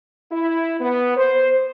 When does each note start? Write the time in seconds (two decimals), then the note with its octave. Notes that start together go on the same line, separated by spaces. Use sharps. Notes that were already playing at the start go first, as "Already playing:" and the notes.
0.31 E4
0.81 B3
1.17 C5